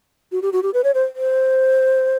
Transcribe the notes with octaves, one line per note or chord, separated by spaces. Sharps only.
F#4
G4
F#4
G4
B4
C#5
C5
C5